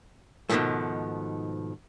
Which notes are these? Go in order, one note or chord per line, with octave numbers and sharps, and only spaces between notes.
G#2 B2 D3 D#3 F3 A3